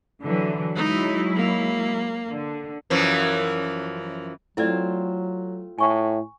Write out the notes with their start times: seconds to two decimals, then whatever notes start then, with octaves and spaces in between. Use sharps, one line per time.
0.23 D3 E3 F#3
0.76 F#3 G#3 D#4 E4
1.36 A#3
2.29 D3
2.90 F#2 E3 F3
4.57 F#3 A3 C4 E4 F4 D5
5.78 A2 G#5 C#6